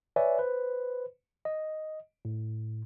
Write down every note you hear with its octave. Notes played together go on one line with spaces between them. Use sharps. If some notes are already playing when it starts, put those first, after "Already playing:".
B4 C#5 D5 E5 G#5
B4 C5
D#5
A2